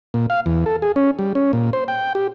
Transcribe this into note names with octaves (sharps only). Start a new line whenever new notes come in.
A#2
F5
E2
A4
G#4
C#4
G3
C#4
A#2
C5
G5
G4